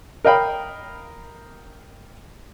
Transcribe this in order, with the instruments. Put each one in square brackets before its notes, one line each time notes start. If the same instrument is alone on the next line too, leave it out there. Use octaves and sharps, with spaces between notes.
[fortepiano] A#4 D#5 F5 G5 B5